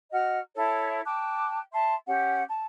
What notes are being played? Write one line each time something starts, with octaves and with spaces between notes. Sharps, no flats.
F#4 D#5 F#5 F6
E4 A4 C#5 A5
G5 A5 D6 F#6
E5 A5 C6
C#4 G4 F#5
A5